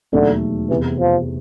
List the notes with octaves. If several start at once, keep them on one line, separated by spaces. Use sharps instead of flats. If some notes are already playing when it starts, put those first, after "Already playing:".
E1 D#2 D3 D#3 F#3 A3
F1 E2 C3 E3
F3